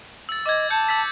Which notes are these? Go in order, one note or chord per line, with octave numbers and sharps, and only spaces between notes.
E6 A6
D#5 D6 G#6
A5 G6 C#7
E6 A6 B6